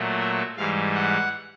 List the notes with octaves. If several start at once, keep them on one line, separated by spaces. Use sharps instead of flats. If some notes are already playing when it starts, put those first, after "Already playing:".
Already playing: A#2 F#3 A3
E5
G#2 E3 G3 F5
F#5